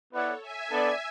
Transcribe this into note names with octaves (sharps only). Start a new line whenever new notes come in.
B3 E4 A4 B4 C#5 D5 F#5
E5 G#5
B3 D4 A4 D5